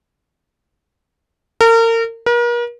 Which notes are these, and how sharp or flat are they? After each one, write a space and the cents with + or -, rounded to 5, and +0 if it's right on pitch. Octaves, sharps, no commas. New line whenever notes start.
A#4 -35
A#4 +40